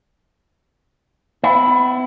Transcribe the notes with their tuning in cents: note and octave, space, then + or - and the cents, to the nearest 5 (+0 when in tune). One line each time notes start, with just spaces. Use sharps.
B3 +40 E4 +0